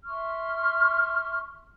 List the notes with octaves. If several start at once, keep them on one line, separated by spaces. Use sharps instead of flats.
E5 C6 C#6 F6